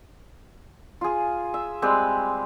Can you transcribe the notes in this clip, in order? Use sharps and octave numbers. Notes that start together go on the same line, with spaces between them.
F4 G#4
E5
G3 G#3 C4 B4